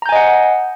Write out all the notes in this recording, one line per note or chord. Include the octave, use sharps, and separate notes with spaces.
D#5 F#5 G#5 A#5 G6